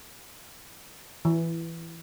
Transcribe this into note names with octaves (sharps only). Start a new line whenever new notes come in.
E3